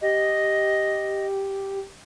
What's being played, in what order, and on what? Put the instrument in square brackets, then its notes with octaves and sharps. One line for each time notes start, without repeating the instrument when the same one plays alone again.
[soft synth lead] G4 [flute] D#5